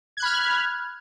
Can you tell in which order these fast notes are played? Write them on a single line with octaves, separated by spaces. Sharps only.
G#6 F#6 B5 F6